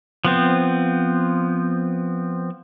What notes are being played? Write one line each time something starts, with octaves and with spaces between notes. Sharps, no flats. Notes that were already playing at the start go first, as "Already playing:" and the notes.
F3 B3 C4